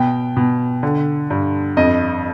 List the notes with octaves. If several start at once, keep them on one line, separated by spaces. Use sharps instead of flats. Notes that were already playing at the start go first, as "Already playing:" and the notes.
Already playing: B2 G5
B2
D3
G2
F2 D#5